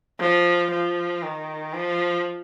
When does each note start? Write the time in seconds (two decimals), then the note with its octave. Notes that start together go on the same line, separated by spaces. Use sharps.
0.20 F3
0.71 F3
1.23 D#3
1.73 F3